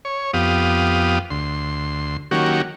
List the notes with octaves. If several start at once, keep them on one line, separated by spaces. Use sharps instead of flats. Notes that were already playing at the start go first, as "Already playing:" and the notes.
C#5
F2 B3 G4 F5 D#6
D2 C6
D#3 F#3 A#3 C#4 F#4 G4